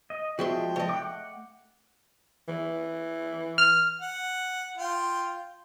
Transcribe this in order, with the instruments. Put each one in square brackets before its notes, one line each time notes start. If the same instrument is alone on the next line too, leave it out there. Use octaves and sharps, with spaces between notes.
[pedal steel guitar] D#5
[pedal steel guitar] F3 G#3 [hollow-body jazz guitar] F#4 E5 C6 [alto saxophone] G5
[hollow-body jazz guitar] A3 D#5
[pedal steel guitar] F#5 D6
[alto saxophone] E3
[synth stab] F6
[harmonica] F#5
F4 G5 C6